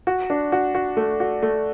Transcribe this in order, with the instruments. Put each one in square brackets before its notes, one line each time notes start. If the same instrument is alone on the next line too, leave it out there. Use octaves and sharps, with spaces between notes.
[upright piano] F#4
D4
F#4
F#4
A3
F#4
A3